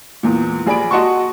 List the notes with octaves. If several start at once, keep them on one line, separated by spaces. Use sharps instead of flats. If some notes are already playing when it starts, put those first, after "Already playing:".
E2 A#2
A#1 G#4 D5 B5 D7
F#4 D#5 F#5 A5 C6 C#6